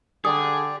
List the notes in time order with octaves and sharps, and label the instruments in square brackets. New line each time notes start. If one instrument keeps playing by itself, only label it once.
[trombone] D3 [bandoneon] G4 D5 [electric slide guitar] G#4 [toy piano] D#6